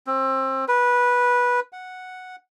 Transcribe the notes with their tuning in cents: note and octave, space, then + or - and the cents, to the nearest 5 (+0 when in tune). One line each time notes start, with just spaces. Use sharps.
C4 +25
B4 -15
F#5 -5